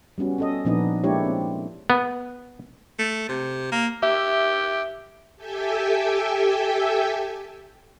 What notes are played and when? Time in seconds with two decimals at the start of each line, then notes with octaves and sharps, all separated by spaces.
0.18 G3 B3 C#4 F#4
0.38 C#4 A4 D#5
0.65 A#2 F3 B3 D4 D#4 D#5
1.04 G#3 A#3 D4 E4 G4 C#5
1.25 C4
1.90 B3
2.99 A3
3.29 C3
3.72 A#3
4.03 G4 E5
5.36 G4 A4 E5 G5 G#5